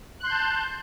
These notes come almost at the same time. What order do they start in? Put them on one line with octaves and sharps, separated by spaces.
F#6 C6 G6 A5